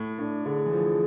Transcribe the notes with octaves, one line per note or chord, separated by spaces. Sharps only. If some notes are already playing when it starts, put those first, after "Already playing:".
Already playing: A2
A2 D4
D3 G#4
E3
F3